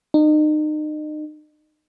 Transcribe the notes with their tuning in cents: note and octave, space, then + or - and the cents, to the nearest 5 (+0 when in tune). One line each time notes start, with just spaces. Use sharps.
D#4 -35